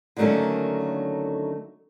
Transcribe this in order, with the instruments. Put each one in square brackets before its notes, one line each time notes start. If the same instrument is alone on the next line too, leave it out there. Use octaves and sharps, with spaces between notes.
[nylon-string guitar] D3 D#3 F#3 A3 A#3 C#4